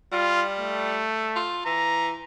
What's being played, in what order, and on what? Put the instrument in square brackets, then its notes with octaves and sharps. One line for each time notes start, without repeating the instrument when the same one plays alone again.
[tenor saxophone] G3 [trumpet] F4
[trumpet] A3
[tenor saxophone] F4
[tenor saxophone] E3 [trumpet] A#5